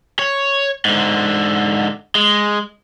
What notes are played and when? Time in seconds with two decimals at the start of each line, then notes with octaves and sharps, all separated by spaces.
0.19 C#5
0.85 G#2 D3
2.15 G#3